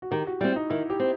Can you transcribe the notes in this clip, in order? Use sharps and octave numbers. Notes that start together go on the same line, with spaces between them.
F#4
D#3 G4
F#4
G3 C4 E4
D#4
D#3 E4
G4
C4